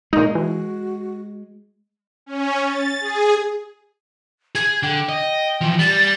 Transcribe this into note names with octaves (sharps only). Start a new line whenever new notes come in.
A#2 G#3 D#4
E3 F#4
C#4
A6
G#4
G#4 G#6
D3 G5
D#5
E3 F3
G3 A6